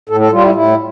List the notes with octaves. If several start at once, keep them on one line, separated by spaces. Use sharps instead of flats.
A2 A4
A4
G3 F4
E4
A2 E4